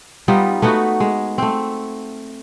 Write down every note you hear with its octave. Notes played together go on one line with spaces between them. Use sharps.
G3 B3 D#4 F4
A3 B3 D#4 F#4
G#3
A3 C4